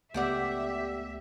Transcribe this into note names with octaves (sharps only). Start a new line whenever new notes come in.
C#2 A3 B3 G4 D5 E5 F#5 G5